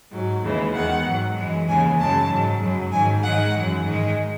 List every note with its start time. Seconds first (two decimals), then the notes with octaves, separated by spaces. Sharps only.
0.12 G#2 F#3
0.43 D#2 C#3 E3 G#3
0.73 E2 D#3 G#3 F#5
1.05 G#2 F#3
1.35 F#2 E3 G#3
1.67 D#2 C#3 E3 G#3 G#5
1.98 F#2 C#3 E3 G#3 A5
2.29 G#2 F#3
2.61 F#2 C#3 F#3
2.91 G#2 D#3 F#3 G#5
3.22 G#2 D#3 G#3 F#5
3.54 F#2 E3 G#3
3.85 G#2 D#3 G#3